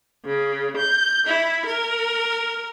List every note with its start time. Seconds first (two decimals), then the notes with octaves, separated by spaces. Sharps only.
0.25 C#3
0.77 G6
1.27 E4
1.64 A#4